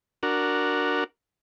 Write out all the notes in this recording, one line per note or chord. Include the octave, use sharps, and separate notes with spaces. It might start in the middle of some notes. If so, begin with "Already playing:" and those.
D4 F#4 A#4